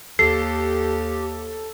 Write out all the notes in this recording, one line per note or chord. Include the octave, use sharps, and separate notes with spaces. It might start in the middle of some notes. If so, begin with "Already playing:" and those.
D#2 G4 A4 C7